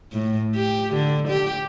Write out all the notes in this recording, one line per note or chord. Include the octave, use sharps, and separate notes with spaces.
A2
G4
D3
G4